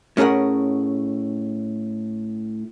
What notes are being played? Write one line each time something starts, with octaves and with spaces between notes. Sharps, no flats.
A2 C#4 G#4 A#4 F#5